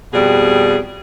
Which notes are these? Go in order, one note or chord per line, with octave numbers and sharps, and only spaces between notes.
F2 B2 G3 G#4